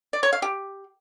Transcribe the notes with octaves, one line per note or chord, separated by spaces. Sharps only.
D5
C#5
F5
G4